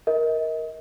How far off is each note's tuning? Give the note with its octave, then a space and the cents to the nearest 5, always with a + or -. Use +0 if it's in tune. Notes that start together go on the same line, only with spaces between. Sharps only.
A#4 +10 D#5 +35